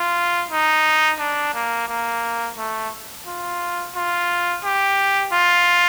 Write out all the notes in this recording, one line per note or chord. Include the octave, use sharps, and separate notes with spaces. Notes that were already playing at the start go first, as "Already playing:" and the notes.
Already playing: F4
D#4
D4
A#3
A#3
A3
F4
F4
G4
F4